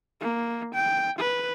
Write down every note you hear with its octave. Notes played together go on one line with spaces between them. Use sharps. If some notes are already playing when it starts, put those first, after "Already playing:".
A#3
G5
B4